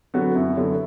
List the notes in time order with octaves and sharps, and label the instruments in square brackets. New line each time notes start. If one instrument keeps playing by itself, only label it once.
[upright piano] D3 F#3 B3 F#4
F#2 E4
D3 F#3 B3